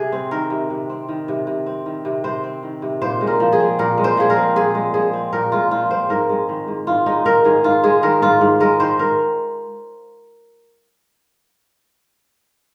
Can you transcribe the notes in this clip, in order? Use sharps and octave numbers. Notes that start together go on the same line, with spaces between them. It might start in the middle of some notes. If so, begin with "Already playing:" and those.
Already playing: C3 G#4
C4
D#3 A#4
C3
C3
C4
D#3
C3
C3
C4
D#3
C3
C3 C5
C4
D#3
C3
A#2 C5
G#3
A#4
F3
G#4
C4
A#2 A#4
G#3
C5
F3 G#4
A#4
C4
A#2 G#4
G#3
F3 G#4
C4
A#2 A#4
G#3 F4
F3 F4
C4 C5
G#2 A#4
G#3
D#3
G#2
G#2 F4
G#3 D#4
D#3 A#4
G#2 G#4
G#2 F4
G#3 G#4
D#3 A#4
G#2 F4
G#2
G#3 A#4
D#3 C5
A#4